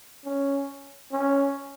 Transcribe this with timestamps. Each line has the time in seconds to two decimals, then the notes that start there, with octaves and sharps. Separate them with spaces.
0.25 C#4
1.11 C#4